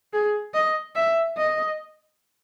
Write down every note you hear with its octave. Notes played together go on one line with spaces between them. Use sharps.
G#4
D#5
E5
D#5